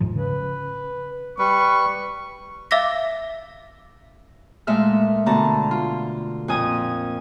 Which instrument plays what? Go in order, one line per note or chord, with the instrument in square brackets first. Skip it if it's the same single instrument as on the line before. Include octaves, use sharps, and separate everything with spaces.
[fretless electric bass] D#1 G#2 F3
[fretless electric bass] C#3 [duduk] B4
[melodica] G3 B4 [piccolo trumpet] C#6
[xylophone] E5 F5 D6 E6 A#6 B6
[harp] A#2 G#3 A3 E5 F6
B2 D3 A3 A5 A#5
F4
F2 A#2 G#5 D#6